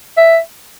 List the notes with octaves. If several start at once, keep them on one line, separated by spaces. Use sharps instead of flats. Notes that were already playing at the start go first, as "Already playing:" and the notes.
E5